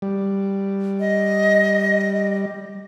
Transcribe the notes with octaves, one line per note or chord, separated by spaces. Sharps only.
G3
D#5